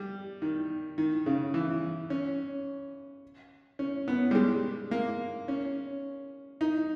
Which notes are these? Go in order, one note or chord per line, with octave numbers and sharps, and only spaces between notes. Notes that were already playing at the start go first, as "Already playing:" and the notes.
Already playing: G3
D#3
D#3
C#3
E3
C#4
C#4
B3
G3
G#3
A#3
C#4
D#4